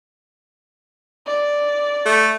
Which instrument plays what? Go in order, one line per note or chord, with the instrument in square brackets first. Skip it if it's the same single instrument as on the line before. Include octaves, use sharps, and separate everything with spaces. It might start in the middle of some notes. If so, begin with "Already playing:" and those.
[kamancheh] D5
[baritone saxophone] A3